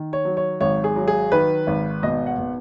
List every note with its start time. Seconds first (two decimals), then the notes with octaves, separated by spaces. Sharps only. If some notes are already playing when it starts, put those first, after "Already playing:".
Already playing: D#3
0.13 C#5
0.25 F#3
0.37 C#5
0.61 G#1 C#5
0.84 G#4
0.96 F#3
1.08 G#4
1.32 D#3 B4
1.67 G#1
2.03 B2 D#5
2.26 F#5
2.38 B2